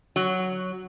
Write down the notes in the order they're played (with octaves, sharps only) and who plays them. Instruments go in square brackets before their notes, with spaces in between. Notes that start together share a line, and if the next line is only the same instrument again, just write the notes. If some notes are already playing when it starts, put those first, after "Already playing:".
[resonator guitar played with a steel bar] F#3